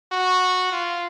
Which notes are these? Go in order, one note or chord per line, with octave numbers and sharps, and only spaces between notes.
F#4
F4